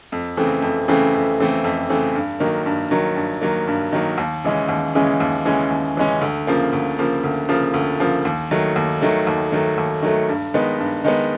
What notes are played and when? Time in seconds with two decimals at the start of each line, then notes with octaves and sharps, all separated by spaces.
0.12 F2
0.37 C#3 E3 A3 C4
0.62 F2
0.88 C#3 E3 A3 C4
1.13 F2
1.39 C#3 E3 A3 C4
1.64 F2
1.90 C#3 E3 A3 C4
2.15 G2
2.40 D#3 F#3 A#3
2.66 G2
2.91 D#3 F#3 A#3
3.16 G2
3.41 D#3 F#3 A#3
3.67 G2
3.92 D#3 F#3 A#3
4.18 D#2
4.44 C#3 E3 G#3 C#4
4.69 D#2
4.95 C#3 E3 G#3 C#4
5.20 D#2
5.45 C#3 E3 G#3 C#4
5.71 D#2
5.96 C#3 E3 G#3 C#4
6.21 D2
6.47 C#3 F3 A#3
6.73 D2
6.99 C#3 F3 A#3
7.24 D2
7.49 C#3 F3 A#3
7.74 D2
7.99 C#3 F3 A#3
8.25 D#2
8.51 D#3 F#3 A3
8.76 D#2
9.01 D#3 F#3 A3
9.27 D#2
9.52 D#3 F#3 A3
9.78 D#2
10.03 D#3 F#3 A3
10.29 G2
10.54 D#3 G#3 B3
10.79 G2
11.04 D#3 G#3 B3